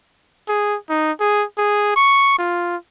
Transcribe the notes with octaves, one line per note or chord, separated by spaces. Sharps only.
G#4
D#4
G#4
G#4
C#6
F4